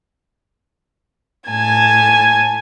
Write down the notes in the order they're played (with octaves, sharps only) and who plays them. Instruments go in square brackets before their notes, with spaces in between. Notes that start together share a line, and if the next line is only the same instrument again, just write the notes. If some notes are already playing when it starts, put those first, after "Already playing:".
[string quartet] A2 G#5 A5 G#6